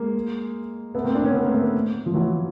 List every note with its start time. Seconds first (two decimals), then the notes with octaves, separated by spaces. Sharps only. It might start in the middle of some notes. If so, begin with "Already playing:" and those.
Already playing: G#3 A#3
0.95 A3 B3
1.04 A#3 C4
1.15 C4 D4
1.24 B3 C#4
1.34 A3 B3
1.44 A#3 C4
1.54 A3 B3
2.06 F3
2.14 E3 F#3